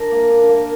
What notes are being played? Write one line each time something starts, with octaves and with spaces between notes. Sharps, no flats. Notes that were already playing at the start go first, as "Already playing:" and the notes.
Already playing: D4 A#4
A#3
D4
A#3